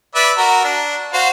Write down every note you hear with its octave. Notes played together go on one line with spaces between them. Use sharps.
B4 D5 E5
F#4 A#4
D4
F#4 C5 F5